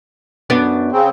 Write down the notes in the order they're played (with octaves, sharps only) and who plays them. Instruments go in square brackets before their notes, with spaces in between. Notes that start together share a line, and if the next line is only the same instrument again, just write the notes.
[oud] F#2 B3 D4
[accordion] C#3 C4